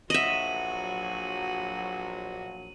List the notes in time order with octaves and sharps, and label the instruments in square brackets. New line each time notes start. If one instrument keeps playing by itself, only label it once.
[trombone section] A#1 F#3 [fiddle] F#4 [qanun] D#5 E5 [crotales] D#7 F#7